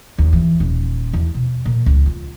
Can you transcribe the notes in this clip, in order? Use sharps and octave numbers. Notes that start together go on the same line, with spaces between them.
D#2
E3
D#1
E2
B2
A#2
C#2
F4